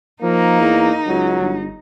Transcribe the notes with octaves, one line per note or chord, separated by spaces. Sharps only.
F3 A#3 D#4
E2
C#2 F#3
G1